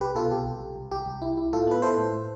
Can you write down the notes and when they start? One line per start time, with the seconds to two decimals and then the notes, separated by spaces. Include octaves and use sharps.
0.01 C2 G4 B4
0.15 B2 F4 A4
0.31 C2 G4
0.46 C2
0.61 C2
0.76 C2
0.91 C2 G4
1.06 C2
1.22 E4
1.37 E4
1.53 A2 F4 A4
1.67 B3 B4
1.82 E4 A4 C5
1.98 A2
2.13 A2